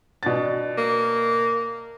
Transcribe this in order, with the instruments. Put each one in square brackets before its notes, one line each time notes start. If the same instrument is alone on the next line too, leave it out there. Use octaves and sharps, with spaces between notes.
[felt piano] B2 D4 A6
[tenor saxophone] A#3